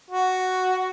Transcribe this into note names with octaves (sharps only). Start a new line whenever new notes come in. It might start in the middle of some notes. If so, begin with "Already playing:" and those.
F#4